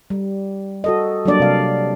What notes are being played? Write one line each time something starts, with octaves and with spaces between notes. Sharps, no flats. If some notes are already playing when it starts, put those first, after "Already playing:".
G3
F#4 A4 D#5
F#3 G3 A#3 D4 D5
C3 F5